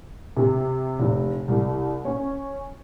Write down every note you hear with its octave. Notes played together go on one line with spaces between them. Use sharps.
C3
F1
C2
C#4